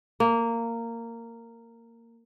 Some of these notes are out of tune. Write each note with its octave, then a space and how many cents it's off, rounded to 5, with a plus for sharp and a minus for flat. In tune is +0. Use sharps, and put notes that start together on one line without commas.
A#3 -15